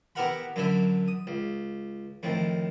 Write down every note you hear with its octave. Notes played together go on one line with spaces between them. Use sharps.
B3 E4 G4 A#4 F#5 B5
F#2 D3 F#3 E4 E5
D#6
C#2
F2 A2 D#3